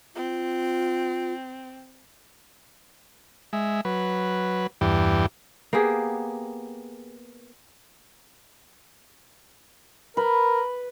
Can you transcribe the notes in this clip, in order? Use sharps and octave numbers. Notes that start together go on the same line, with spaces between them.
C4 F4
G#3 E5
F#3 B4
E2 G2 E3 G4
A#3 B3 G4 G#4
A#4 B4